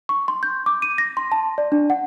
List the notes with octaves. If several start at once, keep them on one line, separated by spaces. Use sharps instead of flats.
C#6
C6
G6
D6
D#7
A#6
C6
A5
D5
D4
F#5